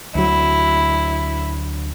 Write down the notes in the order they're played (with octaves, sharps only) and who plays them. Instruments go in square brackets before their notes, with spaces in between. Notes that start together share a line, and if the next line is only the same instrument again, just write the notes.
[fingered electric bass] D2 F#3 [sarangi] E4